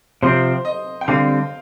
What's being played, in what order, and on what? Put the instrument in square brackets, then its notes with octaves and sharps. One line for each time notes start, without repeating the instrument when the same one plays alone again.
[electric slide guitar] C3 F3 C4 [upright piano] C5
[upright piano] D#5
G5
[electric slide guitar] D3 G3 C4 [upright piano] F5